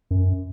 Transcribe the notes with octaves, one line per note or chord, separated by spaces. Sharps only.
F#2